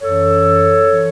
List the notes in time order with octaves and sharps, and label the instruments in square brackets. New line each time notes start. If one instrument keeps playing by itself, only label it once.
[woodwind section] F#2 E3 A4 C#5
E3